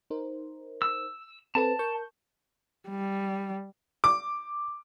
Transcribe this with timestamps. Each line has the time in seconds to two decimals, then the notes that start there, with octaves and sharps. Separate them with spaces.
0.10 D#4 A#4 C5
0.82 E6
1.55 C4 A4 B4 A5
1.79 A#4 C#6 G6
2.89 G3
4.04 D6